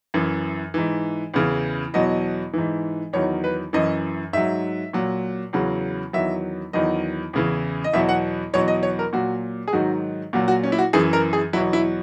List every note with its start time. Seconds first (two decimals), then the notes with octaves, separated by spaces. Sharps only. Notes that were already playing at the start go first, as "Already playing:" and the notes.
0.14 F#2 E3
0.74 G#2 E3
1.34 E2 C#3 E3
1.94 E2 B2 F#3 D#5
2.53 G#2 E3
3.13 E2 D#3 F#3 C#5
3.44 B4
3.73 F#2 E3 D#5
4.33 G#2 F#3 E5
4.93 A#2 F#3
5.53 E2 C#3 F#3
6.13 E2 D#3 F#3 E5
6.73 E2 D#3 F#3 D#5
7.33 E2 C#3 E3
7.84 D#5
7.93 E2 B2 F#3 E5
8.09 F#5
8.53 E2 B2 F#3 C#5
8.68 D#5
8.83 C#5
8.99 A#4
9.13 A#2 F#3 F#4
9.68 G#4
9.73 G#2 D#3 F#3 F#4
10.33 A#2 F#3 F#4
10.48 F#4
10.63 C#4
10.72 E4
10.79 F#4
10.93 F#2 E3 G#4
11.13 A#4
11.33 G#4
11.53 F#3 E4
11.56 E2 B2
11.73 E4